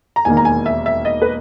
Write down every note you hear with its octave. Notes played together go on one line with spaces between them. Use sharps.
A#5
E1 D#2 D#3 A#3 G#5
A#5
G#5
E5
E5
D#5
B4